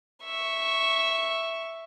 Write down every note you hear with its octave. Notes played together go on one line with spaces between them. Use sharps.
E5 C#6